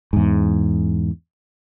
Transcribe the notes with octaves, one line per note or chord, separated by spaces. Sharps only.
E2 G#2